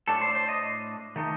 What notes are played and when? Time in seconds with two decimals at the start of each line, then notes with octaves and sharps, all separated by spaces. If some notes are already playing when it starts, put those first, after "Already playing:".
0.08 A2 A3 D4 A4
0.21 C5
0.35 C5
0.48 D#5
1.16 D#3 A3 D#4